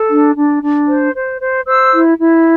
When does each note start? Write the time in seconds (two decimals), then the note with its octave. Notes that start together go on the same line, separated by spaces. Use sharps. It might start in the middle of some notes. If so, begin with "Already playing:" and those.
Already playing: A4
0.08 D4
0.35 D4
0.62 D4
0.88 C5
1.14 C5
1.41 C5
1.66 C5 E6
1.93 E4
2.18 E4